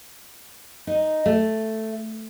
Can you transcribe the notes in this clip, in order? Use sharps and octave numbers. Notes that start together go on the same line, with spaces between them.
D#4
A3